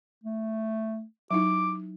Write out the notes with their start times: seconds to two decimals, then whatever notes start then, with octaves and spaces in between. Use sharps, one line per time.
0.24 A3
1.31 F#3 D#4 E4 D6